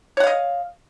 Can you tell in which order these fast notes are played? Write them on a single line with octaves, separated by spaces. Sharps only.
C#5 F#5 F5 D#5